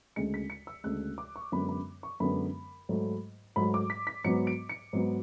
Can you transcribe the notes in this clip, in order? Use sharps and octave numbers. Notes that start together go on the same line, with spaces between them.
D2 C#3 G#3 C#7
B6
C#7
E6
D2 C#3 G#3 F#6
D6
C#6
F#2 D3 G#3 B3 B5
B5
C#6
F#2 D3 G#3 B3 B5
G#2 F#3 A3
G#2 F#3 A3 B5
D6
B6
B6
G#2 F#3 B3 C#7
D7
C#7
G#2 F#3 B3